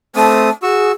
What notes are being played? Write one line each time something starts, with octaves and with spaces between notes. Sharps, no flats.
A3 C4 A5 D#6
F#4 G#4 C#6 E6